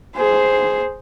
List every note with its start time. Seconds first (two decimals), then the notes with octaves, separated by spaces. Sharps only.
0.16 G#4 C5